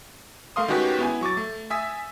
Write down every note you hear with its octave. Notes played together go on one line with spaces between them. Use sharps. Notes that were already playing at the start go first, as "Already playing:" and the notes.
A3 A#4 F5 C6 D#6
D#3 G#3 C#4 F#4 G4 B4
B3 E4 G#5
F#3 C#6 D6 A6
A3
E5 G#5 D#6 E6 B6